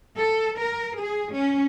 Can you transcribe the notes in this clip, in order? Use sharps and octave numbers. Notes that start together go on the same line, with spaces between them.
A4
A#4
G#4
C#4